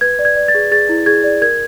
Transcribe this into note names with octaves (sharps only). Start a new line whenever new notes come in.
B4 G#6
D5
G#6
D5
A6
G#4
G#4 A6
E4
G#4 G#6
D5
A#4 G#6